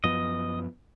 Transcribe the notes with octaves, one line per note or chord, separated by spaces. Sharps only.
F#2 F3 B3 D#5